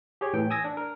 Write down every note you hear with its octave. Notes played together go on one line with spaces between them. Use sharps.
G4 G#4 C#5
A2 E3 G5
G#5 D#6 E6 G#6 A#6
D4
A#4